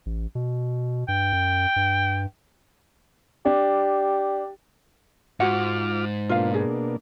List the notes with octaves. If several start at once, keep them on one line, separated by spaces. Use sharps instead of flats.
A1
B2
G2 G5
F#2
G2
D4 G4
G#2 F4 F#4 F#5 D6 F6
B2 A#3 D4 F4 F5
G#4